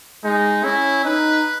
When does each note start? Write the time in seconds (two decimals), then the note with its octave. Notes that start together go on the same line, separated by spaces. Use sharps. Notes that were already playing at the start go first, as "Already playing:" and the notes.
0.24 G#3 D#4
0.64 C#4 E4
1.05 D#4 B4